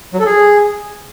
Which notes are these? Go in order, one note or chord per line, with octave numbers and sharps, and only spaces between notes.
F#3
A4
G#4